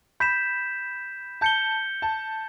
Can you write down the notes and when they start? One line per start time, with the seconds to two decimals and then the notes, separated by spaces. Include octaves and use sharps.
0.20 B5 G6 B6 E7
1.41 A5 G6 C#7 G7
2.02 A5